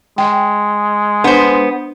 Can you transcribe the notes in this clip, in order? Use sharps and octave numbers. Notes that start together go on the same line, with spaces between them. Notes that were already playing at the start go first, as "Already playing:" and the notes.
G#3 G5
B3 D4 C5